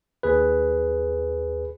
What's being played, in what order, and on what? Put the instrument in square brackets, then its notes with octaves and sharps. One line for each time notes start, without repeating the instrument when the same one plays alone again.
[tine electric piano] D#2 G#4 B4